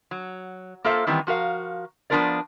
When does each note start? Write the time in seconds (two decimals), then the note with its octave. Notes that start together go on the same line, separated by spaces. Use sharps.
0.11 F#3
0.84 A#3 F4 A4 C5 E5
1.07 D#3 E3 G3 B3 C4
1.27 F3 F#4 A#4 F5
2.10 F3 B3 D4 F4 A#4 D5